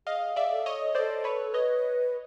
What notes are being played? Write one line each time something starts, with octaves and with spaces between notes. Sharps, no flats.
G#4 D#5 F5
G#4 D5 E5
A4
C#5 D#5
A4 C5 D5
B4 C#5
B4 C#5 D#5